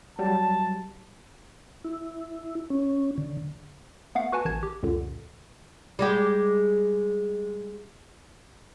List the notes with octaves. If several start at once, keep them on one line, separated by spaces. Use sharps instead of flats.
F#3 G3 A5
E4
C#4
D3
A3 B3 F5 F#5
F#4 B4 F#5 G#5 A5
A1 D#3 A5 G#6
G4
C#2 F#2 A#2 D3
G3 G#3 G4